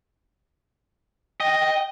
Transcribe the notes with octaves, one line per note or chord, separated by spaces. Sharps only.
D#5 G5